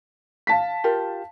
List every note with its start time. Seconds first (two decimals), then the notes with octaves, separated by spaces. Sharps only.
0.47 F5 A5 B6
0.84 F4 G4 A#4